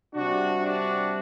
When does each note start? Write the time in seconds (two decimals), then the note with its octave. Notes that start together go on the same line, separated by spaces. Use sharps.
0.14 C3 G3 D4 F#4
0.65 D4 F#4